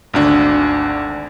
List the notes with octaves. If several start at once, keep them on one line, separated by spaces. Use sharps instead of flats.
G#1 D2 D4